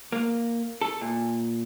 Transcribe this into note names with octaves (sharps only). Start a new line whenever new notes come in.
A#3
A4
A#2